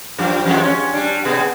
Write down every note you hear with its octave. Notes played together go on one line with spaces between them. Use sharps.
F#2 F3 G3
F2 F3 G#3
C#4
G3 D4
B2 B3 G#4